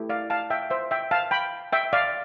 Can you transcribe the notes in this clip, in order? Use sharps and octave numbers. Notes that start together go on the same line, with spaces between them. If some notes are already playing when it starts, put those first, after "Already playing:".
Already playing: A3 E4 G4
D5 F5
F5 A5
E5 G5
C5 E5
E5 G5
F5 A5
G5 B5
E5 G5
D5 F5